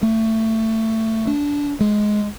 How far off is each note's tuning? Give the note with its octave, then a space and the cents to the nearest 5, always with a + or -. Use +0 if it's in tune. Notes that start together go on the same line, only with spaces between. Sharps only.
A3 +20
D4 -20
G#3 +10